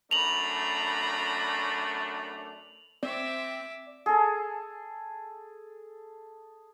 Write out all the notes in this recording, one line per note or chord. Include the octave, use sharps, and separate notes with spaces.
F#2 A3 D4 A#5 B5 F7 F#7
C4 D5 E5 D6
G#4 A4